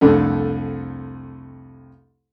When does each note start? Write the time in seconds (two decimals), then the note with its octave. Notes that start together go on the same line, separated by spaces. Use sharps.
0.01 C2 F2 D3 A3